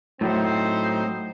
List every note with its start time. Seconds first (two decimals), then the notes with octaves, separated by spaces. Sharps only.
0.21 A2 F#3 A3 C4 D#4 C5